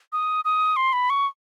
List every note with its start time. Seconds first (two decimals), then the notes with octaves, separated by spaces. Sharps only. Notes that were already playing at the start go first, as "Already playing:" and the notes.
0.13 D#6
0.45 D#6
0.76 C6
0.93 B5
1.10 C#6